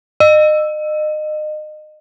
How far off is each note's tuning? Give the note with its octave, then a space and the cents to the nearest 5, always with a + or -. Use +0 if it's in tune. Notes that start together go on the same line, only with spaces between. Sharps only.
D#5 -30